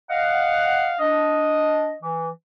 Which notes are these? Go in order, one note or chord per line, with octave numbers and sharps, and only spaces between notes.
D#5 F5 F#5
D4 D#5
E3